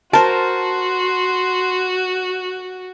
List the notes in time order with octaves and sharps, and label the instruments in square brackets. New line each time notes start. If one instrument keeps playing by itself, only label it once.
[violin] F#4 [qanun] A#4 C5 [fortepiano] A5 [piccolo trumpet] C6